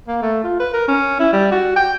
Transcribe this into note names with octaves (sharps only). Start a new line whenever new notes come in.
A#3
A3
F4
B4
A#4
C#4
E4
G3
F#4
G5